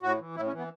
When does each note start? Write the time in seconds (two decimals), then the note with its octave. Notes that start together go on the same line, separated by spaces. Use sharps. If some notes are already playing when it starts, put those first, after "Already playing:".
0.02 A2 F#4
0.19 E3
0.36 A2 E4
0.47 C#4
0.53 E3
0.58 B3